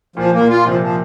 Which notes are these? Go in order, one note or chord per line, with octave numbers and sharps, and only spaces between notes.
A#2 F3
A#3
A#2
F4
C3 F3
F3